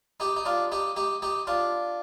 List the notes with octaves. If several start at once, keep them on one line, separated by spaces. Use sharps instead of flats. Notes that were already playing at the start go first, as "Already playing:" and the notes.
D#4 G4
D#4
D4 F4
D#4 G4
D#4 G4
D#4 G4
D4 F4